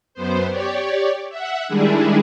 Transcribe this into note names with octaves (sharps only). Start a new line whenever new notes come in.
F#2 B3 C5
G4 C#5 D5
E5 F#5
D#3 G3 G#3 D4 E4 G#4